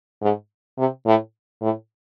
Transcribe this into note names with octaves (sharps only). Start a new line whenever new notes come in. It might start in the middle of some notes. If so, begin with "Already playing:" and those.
G#2
C3
A2
A2